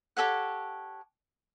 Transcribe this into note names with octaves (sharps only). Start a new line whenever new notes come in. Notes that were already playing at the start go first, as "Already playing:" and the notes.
G4 A4 C#5 F#5